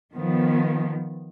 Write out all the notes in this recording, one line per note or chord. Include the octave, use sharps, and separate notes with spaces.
D#3 F3 B3